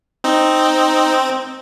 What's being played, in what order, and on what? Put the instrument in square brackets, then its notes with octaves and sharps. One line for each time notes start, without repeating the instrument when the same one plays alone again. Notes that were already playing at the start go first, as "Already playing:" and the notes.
[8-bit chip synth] C4 D#4